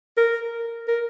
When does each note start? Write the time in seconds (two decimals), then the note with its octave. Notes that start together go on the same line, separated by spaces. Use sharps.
0.17 A#4
0.88 A#4